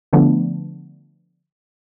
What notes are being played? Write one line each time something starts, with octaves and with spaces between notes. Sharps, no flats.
D3 F3 A3 B3 D4